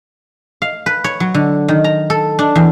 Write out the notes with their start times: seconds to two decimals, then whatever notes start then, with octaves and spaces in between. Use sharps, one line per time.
0.62 F5
0.86 B4
1.04 C#5
1.20 F#3
1.34 D3
1.68 D#3
1.84 A#5
2.10 A4
2.39 D4
2.55 E2